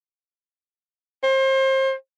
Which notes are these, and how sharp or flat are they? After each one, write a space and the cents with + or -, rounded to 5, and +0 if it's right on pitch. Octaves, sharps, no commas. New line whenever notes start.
C5 +30